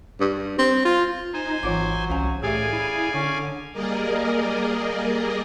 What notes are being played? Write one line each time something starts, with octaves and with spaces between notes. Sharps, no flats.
G2
C4
F4
D#4 C5 G#5
G#1 E3 F#3 F4 D6
C2 C#4 F5 G#5
A2 G4 G#4 D5 E5 F5 G#5
E4
D3 C#4
G3 A#3 G#4 A#4 D5 D#5